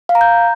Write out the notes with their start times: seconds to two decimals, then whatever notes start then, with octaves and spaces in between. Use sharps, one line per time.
0.09 F5
0.15 A#5
0.21 G6